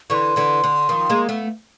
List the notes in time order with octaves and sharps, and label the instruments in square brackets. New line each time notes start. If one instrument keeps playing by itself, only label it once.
[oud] D3 E3 [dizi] C6 C#6
[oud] D3 E3
D3
D#3 F3
G#3 A#3
A3 B3